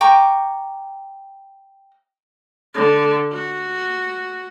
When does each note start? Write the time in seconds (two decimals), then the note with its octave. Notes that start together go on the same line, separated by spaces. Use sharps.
0.01 G5 A#5 C#6 D6
2.74 D3
3.32 F#4